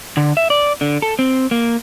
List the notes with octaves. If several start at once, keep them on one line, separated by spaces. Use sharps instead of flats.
D3
E5
D5
D3
A4
C4
A#3